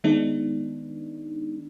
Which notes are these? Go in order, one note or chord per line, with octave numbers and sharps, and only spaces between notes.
D#3 G#3 B3 D4 D#4